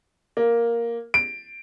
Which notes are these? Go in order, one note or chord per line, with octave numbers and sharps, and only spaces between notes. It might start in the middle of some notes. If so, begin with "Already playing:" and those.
A#3
D7